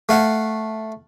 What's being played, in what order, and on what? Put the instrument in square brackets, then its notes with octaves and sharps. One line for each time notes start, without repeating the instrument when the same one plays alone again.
[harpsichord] A3 F5 F#5